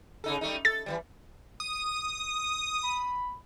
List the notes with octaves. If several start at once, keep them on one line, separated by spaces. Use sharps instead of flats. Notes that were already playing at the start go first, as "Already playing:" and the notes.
C#3 D#4 A4
G3 A3 D#4
A4 A6
E3 F3 G3
D#6
B5